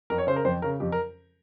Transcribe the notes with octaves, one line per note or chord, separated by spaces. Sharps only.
F2 A#4
C#5
C#3 C5
A#4
F2 C5
C#3 A#4
F2 G4
A#4